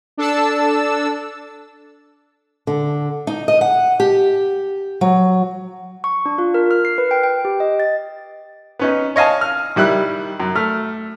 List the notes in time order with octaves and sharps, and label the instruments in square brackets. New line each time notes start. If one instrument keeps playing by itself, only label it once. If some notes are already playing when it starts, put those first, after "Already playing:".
[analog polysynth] D4 A4 A5 E6
[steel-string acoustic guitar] D3
D#4
D#5
F#5
G4
F#3
[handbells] C#6
D4
F4
A#4
F6
C7
B4
G5
G5
G4
D#5
A6
[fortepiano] B3 C#4 D#4
C#5 D#5 F5 G#5 A5
F6
D#3 G3 E4 F#6
F#2
A3 F6